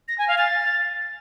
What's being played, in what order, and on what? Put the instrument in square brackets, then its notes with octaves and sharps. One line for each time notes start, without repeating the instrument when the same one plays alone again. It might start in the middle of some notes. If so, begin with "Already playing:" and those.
[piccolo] A#6
G#5
F5
A6